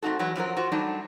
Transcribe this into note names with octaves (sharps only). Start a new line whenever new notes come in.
A3 C4 D#4 F#4 A4
E2 F#3 G#3 B3
F#2 F3 F#3 A#4
F4 F#4 C5
F#3 G3 A3 D4 D#4